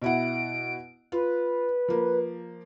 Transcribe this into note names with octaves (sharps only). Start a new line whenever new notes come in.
B2 E4 F#5 D7
F4 B4
F3 A#3